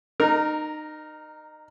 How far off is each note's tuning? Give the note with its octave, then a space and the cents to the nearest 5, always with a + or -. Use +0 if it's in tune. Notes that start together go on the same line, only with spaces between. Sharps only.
D#4 -25 A#4 +0